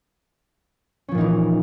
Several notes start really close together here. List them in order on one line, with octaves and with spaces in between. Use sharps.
C#4 F3 A#2 D#4 E3